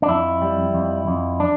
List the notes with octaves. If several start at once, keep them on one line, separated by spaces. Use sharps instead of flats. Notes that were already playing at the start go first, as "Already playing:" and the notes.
D4
F2 E4
G3
F2
F2
D4